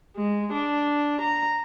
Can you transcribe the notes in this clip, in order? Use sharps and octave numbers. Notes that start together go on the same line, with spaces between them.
G#3
D4
A#5